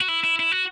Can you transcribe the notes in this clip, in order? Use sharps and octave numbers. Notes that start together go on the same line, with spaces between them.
F#4
E4
E4
E4
F#4